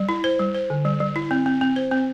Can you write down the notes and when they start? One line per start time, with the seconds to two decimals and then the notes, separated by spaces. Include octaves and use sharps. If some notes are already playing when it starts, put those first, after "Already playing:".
Already playing: G3
0.09 E4
0.24 C5
0.39 G3
0.55 C5
0.70 D3
0.85 G3
1.00 G3
1.16 E4
1.31 C4
1.46 C4
1.61 C4
1.76 C5
1.91 C4